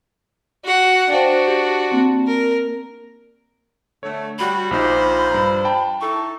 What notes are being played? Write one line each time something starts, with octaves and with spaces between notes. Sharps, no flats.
F#4 F#5
D4 F#4 C5 F5 G5
G4
A#3 C4
A#4
D3 A3 C#5
G3 F#4 B5
A#1 F3 D#4 F4 C5 D6
G2 A#5
G5 A5
D#4 E4 A4 C#6